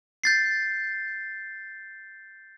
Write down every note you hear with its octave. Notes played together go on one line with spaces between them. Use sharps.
G6 A6 C7